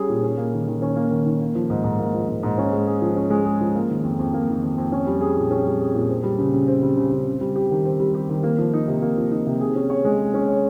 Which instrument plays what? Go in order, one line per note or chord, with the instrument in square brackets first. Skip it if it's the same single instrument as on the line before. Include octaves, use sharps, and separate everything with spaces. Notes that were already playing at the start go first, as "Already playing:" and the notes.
Already playing: [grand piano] G3 C#4 G#4
A#2
C#4
A#3
D#3
D#3
C#4
A#3
D#3
D#3
A#3
F3
G#2
G#2
A#3
F3
G#2
G#2
C#4
G#3
G#4
F3
C#4
G#3
G#4
F3
A#3
D#3
F2
F2
A#3
D#3
F2
F2
C#4
G3
G#4
A#2
C#4
G3
G#4
A#2
C4
G3
C#3
C#3
C4
G3
C#3
C#3
C4
G3
G4
D#3
C4
G3
G4
D#3
A#3
F3
D#4
C3
A#3
F3
D#4
C3
G#4
C#4
C#5
G#3
G#4
C#4
C#5